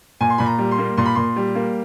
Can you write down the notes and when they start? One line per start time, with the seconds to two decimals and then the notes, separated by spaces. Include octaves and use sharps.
0.21 A#2 G#5
0.30 C6
0.38 A#2 B5
0.46 A#5
0.58 G3
0.71 C6
0.78 A#3
0.97 A#2 C6
1.06 B5
1.15 A#2 C6
1.36 G3
1.55 A#3